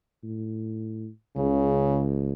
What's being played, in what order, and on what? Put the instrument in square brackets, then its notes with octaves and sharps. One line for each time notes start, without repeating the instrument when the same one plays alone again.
[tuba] A2
[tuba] C#2 [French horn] C#3